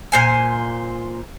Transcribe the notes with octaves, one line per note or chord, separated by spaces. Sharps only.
A#2 C5 G#5